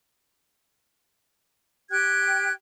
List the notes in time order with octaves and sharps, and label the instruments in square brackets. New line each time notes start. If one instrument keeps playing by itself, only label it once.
[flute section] G4 G5 F#6 G#6